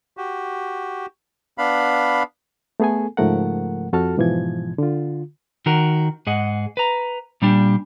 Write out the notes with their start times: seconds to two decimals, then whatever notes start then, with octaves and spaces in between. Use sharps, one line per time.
0.17 F#4 G4
1.58 B3 D4 F5 B5
2.80 A3 B3 G#4 A4 G#5
3.17 G#2 C#3 F3 A3 A#4 F#5
3.93 F2 F#4 A4 A5 F6
4.17 G#2 B2 E3 F3 G#6
4.78 D3 F4
5.66 D#3 F#4 A#4
6.27 G#2 G#4 D#5 F#5
6.77 B4 A#5
7.42 A#2 G3 D4 G4